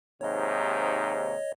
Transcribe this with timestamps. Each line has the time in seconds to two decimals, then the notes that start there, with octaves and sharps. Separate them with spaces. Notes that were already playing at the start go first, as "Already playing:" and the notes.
0.21 D#2 G#2 C3 C#5 D#5